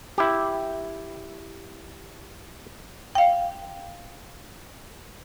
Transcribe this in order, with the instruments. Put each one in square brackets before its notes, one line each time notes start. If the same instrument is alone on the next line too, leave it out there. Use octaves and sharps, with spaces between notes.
[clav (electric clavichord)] E4 G4
[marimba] F5 G5